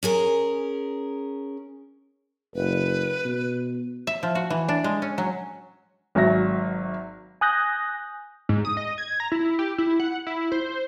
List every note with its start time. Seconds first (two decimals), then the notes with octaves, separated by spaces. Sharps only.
0.03 C#4 G#4 A#4
2.55 F#1 B4
3.25 B2
4.07 E5
4.23 F3
4.35 F#4
4.50 E3
4.69 D4
4.84 G#3
5.02 C#4
5.18 F#3
6.15 G#1 F#3 E5 A#6
7.41 G#5 D#6 F#6 G6 A#6
8.49 G#2
8.65 D#6
8.77 D#5
8.98 G#6
9.20 A#5
9.32 E4
9.59 G4
9.78 E4
10.00 F#5
10.27 E4
10.52 C5